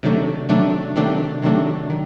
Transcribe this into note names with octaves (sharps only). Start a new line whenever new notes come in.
C3 D#3 F#3 A3 D4
C3 D#3 F#3 A3 D4
C3 D#3 F#3 A3 D4
C3 D#3 F#3 A3 D4
D#3